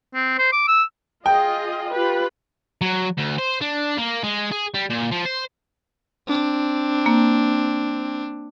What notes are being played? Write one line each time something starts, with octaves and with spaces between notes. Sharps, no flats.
C4
C5
D6
E6
F4 G#4 D#5 G5
F4 G4 B4
F#3
D2
C5
D4
A#3
G#3
G#4
G3
A#2
F3
C5
C4 D4
A#3